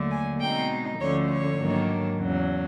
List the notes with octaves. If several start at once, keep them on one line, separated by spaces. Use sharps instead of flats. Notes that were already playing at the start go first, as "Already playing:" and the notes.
Already playing: D#2 D3 F#3 A3
G#5
B2 G#3 C4 D#4 G5
D2 D3 F3 A3 C#4 C#5
C#5
G#2 D#3 F#3 A#3 D4
E2 C#3 F#3